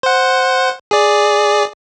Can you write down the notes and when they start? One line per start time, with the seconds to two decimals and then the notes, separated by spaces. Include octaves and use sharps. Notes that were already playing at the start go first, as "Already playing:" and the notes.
0.03 C5 F#5
0.91 G#4 D5